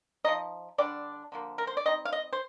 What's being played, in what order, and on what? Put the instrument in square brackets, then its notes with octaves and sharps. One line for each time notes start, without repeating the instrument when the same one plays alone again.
[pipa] F3 A#3 D#4 D#5
D3 G3 D4 D5
D3 F3 A#3
A#4
C5
D5
G3 C4 D#4 D#5
F5
D#5
C5